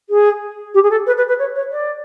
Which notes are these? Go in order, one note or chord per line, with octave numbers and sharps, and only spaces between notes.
G#4
G4
G#4
A4
B4
B4
B4
C#5
C#5
D5